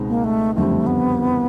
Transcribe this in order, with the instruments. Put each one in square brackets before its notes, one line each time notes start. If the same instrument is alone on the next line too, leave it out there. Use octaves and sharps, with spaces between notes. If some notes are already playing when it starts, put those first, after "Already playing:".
Already playing: [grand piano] C#2 B2 G#3 C4 D#4
[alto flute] A#3
A3
[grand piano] F#1 F2 D3 G3 C4 [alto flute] A3
[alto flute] B3